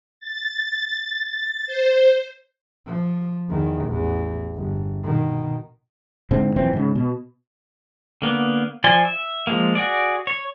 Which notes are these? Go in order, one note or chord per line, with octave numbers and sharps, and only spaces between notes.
A6
C5
F3
E2 D#3
A1 E2
G1
B2 D#3
G#2 D3 C4
D#1 F2 E3 C4
G#2 C#3
B2
D3 A#3 B3
F3 D5 G#5 C6
E5
F3 G#3 A#3
F#4 G#4 D5
C#5